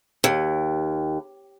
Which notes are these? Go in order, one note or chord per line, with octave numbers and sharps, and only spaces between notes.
D#2